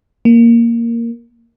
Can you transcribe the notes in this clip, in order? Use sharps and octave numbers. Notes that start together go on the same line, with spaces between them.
A#3